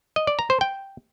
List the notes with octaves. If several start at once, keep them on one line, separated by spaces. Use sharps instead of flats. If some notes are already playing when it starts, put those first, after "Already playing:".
D#5
D5
A#5
C5
G5